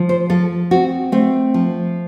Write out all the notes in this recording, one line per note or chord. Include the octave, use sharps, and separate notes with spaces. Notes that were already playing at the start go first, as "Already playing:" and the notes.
Already playing: F3
C5
F3 A4
C4 F#4
A3 C4
F3